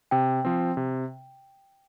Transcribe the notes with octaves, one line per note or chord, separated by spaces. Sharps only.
C3 G5
F3 C4
C3